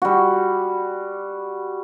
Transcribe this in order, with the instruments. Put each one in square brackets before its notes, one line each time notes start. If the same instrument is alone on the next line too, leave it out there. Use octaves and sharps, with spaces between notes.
[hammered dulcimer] G3 F#4